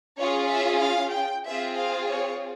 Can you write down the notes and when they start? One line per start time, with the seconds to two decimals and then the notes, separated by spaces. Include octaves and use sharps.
0.18 C#4 F4 G#4 C#5
0.49 E5
0.82 F5
1.13 G5
1.46 C4 F4 G#4 E5
1.77 F5
2.10 C#5